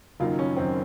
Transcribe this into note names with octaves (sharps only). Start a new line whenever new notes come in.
F#1 F#2 D#3 F4
C#4
F#2 D#3 C4